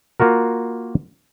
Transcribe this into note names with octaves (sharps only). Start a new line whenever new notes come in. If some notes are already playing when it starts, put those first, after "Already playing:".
A#3 F4 F#4 A#4